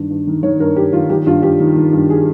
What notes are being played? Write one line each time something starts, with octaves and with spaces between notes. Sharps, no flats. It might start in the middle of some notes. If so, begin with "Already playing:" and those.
Already playing: G2 D#3
G2
D#3
D#3 C#5
G2 A#4
G2 G4
D#3 F4
D#3 G4
G2 F4
G2 G4
D#3
D#3
G2
G#4